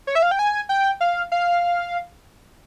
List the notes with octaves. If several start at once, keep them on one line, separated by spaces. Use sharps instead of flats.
C#5
E5
F5
G5
G#5
G5
F5
F5